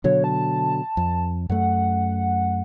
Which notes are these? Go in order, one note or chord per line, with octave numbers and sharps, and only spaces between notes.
B2 D3 F#3 C#5
A5
F2
F#2 A3 F#5